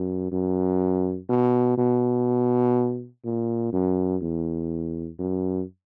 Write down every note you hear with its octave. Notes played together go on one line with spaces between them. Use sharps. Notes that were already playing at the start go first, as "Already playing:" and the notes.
Already playing: F#2
F#2
B2
B2
A#2
F#2
E2
F#2